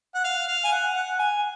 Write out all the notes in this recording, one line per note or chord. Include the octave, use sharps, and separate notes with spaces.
F#5
F5
F5
G#5
F#5
F#5
G#5